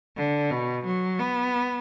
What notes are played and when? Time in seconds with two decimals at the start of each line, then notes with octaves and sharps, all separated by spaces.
0.17 D3
0.50 B2
0.86 F#3
1.20 B3